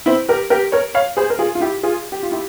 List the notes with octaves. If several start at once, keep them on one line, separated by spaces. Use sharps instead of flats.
C4 E4
G4 A#4
G4 A#4
A#4 C#5
C#5 F5
G#4 C5
A#4
F4 G#4
F4
E4 G4
F4 G#4
G4
F4
E4 G4